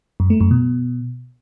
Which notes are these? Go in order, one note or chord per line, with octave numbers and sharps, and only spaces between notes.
F#2
A3
F#2
B2